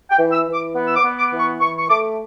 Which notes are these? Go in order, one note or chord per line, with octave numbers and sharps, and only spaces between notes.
G5
E3
E6
E3
D6
B3
E6
D6
B3
D6
E3
C#6
E3 C#6
C#6
A3 D6